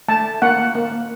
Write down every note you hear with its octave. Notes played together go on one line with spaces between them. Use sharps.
A3 A5
A#3 F#5
A#3